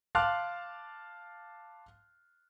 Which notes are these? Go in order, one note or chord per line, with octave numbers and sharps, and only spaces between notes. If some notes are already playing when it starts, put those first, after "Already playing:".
F5 A5 C6 D6 F6 F#6